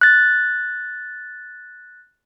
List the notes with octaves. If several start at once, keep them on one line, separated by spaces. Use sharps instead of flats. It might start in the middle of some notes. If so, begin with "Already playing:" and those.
F#6 A6